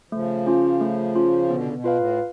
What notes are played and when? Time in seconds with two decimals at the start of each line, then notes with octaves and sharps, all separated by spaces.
0.11 C#3 F3 A3
0.47 C#4 F4
0.81 A3
1.15 C#4 F4
1.49 B2 D3 B3
1.62 C#3
1.73 B2
1.84 F4 B4 F5
1.95 A2